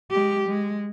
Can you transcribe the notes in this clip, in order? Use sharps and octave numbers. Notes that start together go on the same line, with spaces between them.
G#3 G4
G#3